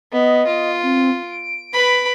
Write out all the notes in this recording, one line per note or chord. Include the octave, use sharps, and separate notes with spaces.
B3 D#5
F4
C4
D7
B4 B5